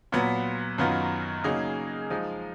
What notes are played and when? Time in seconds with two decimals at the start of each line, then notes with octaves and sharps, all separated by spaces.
0.12 A#2 F#3 B3
0.78 F#2 D#3 F#3 B3 F4
1.44 C#3 F#3 A#3 D#4 G#4
2.10 F3 G#3 D#4